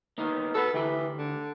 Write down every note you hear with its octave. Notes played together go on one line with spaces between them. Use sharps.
A#3 B3 D#4
F#4 A4 B4 F#5
D2 E3 G4
D3